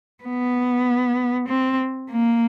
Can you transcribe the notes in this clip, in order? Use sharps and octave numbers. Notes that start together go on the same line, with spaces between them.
B3
C4
A#3